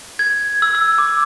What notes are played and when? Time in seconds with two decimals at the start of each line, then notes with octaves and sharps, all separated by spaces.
0.19 G#6
0.62 E6
0.75 E6
0.98 D6